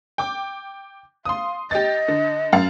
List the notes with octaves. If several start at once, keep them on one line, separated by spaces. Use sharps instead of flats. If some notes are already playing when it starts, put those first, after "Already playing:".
G5 D6
F5 C6 D#6
G4 D#5 A6
D3
F#2 F5 A6